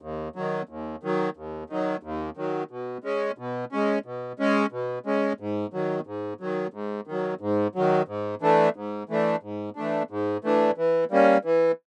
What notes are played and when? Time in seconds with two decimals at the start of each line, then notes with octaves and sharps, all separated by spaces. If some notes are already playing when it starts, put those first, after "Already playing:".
0.02 D#2
0.36 D#3 F#3
0.69 D#2
1.03 D#3 F#3
1.37 D#2
1.70 D#3 F#3
2.03 D#2
2.37 D#3 F#3
2.71 B2
3.04 G#3 C#4
3.38 B2
3.72 G#3 C#4
4.06 B2
4.39 G#3 C#4
4.72 B2
5.06 G#3 C#4
5.40 G#2
5.73 D#3 F#3
6.07 G#2
6.41 D#3 F#3
6.74 G#2
7.07 D#3 F#3
7.41 G#2
7.75 D#3 F#3
8.08 G#2
8.42 E3 A3 D4
8.76 G#2
9.09 E3 A3 D4
9.43 G#2
9.76 E3 A3 D4
10.11 G#2
10.44 E3 A3 D4
10.78 E3
11.11 G3 A#3 C#4
11.45 E3